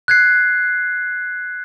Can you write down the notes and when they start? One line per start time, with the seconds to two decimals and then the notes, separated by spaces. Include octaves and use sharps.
0.08 F#6 G#6 C7